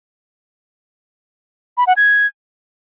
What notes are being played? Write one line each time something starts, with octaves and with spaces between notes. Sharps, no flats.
B5
F#5
G#6